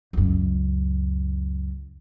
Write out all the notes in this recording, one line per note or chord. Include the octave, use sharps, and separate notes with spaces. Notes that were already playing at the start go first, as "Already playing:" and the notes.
C#2 F#2